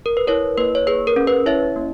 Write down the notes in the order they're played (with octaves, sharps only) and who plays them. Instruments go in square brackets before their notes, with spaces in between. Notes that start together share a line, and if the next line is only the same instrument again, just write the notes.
[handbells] A#4
B4
E4 A#4 C#5
A#3 B4
C#5
G#4 B4
A#4
C#4
B4
E4 C#5 E5
A#3